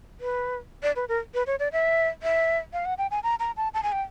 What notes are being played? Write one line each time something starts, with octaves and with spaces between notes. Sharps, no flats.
B4
D5
B4
A#4
B4
C#5
D5
E5
E5
F5
F#5
G5
G#5
A#5
A#5
A5
A5
G#5
G5